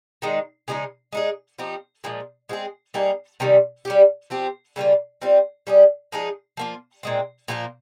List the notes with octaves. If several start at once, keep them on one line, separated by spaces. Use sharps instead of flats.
D#3 G#3 D#4
C#3 F3 G#3 D#4
G#3 D#4 G#4
F3 C4 D#4 G4
A#2 F3 G#3
G#3 C4 F4 G#4
G3 A#3 D#4 G#4
C3 D#3 G3 C#4
G3 C#4 G4
F3 C4 G4
C#3 G3 A#3 F4
G3 C4 F4
G3 C#4 G#4
F3 G#3 D#4 G#4
F3 A#3 F4
A#2 G#3 C4
A#2 F3 A#3 F4